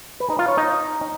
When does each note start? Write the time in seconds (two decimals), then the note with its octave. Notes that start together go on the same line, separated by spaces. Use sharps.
0.20 B4
0.30 D#4
0.39 F4
0.48 C#5
0.57 D#4